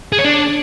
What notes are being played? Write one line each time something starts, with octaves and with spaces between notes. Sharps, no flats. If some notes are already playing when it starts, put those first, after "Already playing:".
G#4
C#5
D4